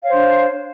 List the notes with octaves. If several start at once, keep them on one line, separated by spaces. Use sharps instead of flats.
D4 C5 C#5 F5